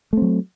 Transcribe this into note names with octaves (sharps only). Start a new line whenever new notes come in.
F#3 A3 C4